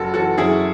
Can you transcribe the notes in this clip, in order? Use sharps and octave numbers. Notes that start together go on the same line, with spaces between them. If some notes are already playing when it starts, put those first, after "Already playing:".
Already playing: F#1 F#4 A4
E3 F#4 A4
F#2 E4 G#4